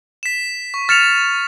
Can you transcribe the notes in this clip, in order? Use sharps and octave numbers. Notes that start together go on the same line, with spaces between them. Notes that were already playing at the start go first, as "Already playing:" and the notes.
B6 E7
C#6
F6 A6 C#7 E7 F7